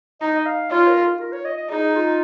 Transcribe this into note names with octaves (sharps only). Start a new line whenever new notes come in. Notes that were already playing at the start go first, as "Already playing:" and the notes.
D#4 D#5
D#5
F5
F4 C#5
A#4
F4
A#4
C#5
D#5
D#5
D#4 G#4
F4